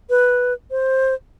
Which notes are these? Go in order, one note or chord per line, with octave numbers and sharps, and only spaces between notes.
B4
C5